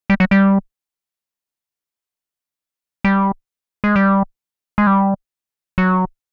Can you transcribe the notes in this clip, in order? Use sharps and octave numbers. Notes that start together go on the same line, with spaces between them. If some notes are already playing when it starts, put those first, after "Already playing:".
G3
F#3
G3
G3
G#3
G3
G#3
G3
F#3